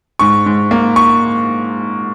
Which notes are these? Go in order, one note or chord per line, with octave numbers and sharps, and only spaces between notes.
G#2 C#6
G#2
A#3
C#6